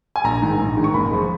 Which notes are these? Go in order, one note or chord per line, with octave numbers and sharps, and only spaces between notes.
G#5
A#1 A#5
G#2 D#3
A#1
G#2 D#3
C#6
F#1 B5
F3 G#3